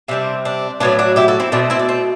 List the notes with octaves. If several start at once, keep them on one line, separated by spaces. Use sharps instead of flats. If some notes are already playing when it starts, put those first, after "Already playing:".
C3 G3 C4 D4
D4
A2 F#3 B3 D4
D4 F#4
E4 G4
F#4 A4
C4 E4
B2 A3 C4 D4
C4 E4
D4
C4